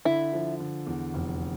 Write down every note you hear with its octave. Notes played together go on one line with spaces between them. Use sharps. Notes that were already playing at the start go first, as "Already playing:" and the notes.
D3 E4
F3
D3
E2
F1